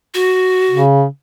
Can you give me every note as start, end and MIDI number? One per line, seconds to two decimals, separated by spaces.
0.14 0.80 66
0.71 1.05 49